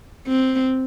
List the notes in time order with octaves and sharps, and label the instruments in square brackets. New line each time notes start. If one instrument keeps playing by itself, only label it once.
[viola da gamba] C4